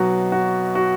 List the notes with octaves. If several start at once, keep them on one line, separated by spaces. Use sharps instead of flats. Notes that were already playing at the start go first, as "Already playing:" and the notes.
Already playing: B1 B2 F#3 F#4
F#4
F#4